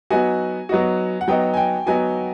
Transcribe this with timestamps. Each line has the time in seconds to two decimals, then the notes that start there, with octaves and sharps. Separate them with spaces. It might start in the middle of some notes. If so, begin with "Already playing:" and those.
0.10 F#3 B3 D#4 F#4 G#5
0.69 F#3 B3 D#4 F#4
1.21 F#5
1.28 F#3 B3 D#4 F#4 G5
1.54 G#5
1.57 G5
1.86 F#3 B3 D#4 F#4 G#5